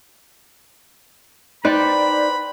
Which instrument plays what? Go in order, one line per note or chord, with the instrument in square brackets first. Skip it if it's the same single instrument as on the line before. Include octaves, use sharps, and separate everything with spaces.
[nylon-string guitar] D#4 [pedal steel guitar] B4 C5 G5 [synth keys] D5 [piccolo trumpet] B5